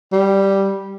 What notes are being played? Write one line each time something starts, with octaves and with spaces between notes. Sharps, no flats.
G3